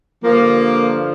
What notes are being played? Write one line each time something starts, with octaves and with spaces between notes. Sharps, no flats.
G2 D3 F3 A#3